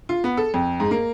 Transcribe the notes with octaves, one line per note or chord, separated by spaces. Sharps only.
F4
B3
A4
F2
G#2
A#3